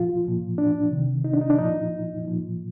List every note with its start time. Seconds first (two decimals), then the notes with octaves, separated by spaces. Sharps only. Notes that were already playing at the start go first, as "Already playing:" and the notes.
Already playing: A#2 F3 F4
0.25 A#2 F3
0.58 D4
0.92 C3 D#3
1.24 D#4
1.34 D4
1.41 D#4
1.50 D4
1.58 A#2 F3 D#4
2.25 A#2 F3